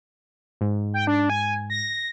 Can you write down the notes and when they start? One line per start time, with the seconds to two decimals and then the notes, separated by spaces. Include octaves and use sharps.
0.61 G#2
0.94 G5
1.07 D4
1.30 G#5
1.70 A#6